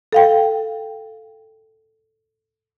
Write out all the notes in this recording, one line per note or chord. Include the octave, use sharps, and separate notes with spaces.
A4 F5 G5